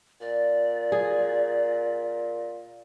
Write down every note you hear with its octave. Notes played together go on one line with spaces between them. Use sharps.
A#2 D5
G#4